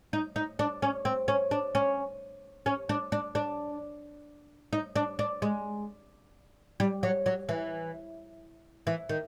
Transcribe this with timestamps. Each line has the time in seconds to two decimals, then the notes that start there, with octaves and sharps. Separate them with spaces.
0.13 D#4
0.36 D#4
0.59 D4
0.82 C#4
1.05 C4
1.28 C#4
1.51 D4
1.75 C#4
2.66 C#4
2.89 D4
3.12 D4
3.35 D4
4.73 D#4
4.96 D4
5.19 D4
5.42 G#3
6.80 G3
7.03 F#3
7.26 F#3
7.49 E3
8.87 E3
9.09 D#3